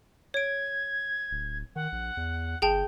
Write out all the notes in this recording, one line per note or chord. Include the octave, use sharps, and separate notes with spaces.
C#5 G#6 D7
D1
D#3 F#5
A#1
E2
G1 G#4 G5 A5 G6